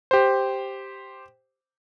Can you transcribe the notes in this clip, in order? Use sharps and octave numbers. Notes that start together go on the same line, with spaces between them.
G4 C5